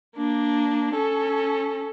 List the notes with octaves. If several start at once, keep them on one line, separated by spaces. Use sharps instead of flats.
A#3 D4
C#4 A4